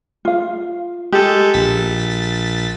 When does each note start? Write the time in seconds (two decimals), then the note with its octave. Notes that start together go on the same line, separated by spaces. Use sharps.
0.25 F4 F5
1.13 G#3 G4 A4
1.54 A#1 A6 B6